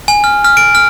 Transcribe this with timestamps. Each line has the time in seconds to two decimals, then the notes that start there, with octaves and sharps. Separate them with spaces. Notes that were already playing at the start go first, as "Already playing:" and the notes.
0.08 G#5
0.24 F6
0.44 F6
0.57 D7
0.75 F6